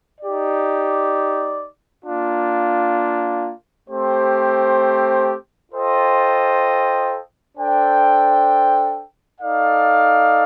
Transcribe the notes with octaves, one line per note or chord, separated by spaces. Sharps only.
D#4 G4 D5
A#3 D4 F4
A3 C4 G4 C5
F4 A4 C5 D#5 G5
D4 A4 C5 G5
D#4 A4 D5 F5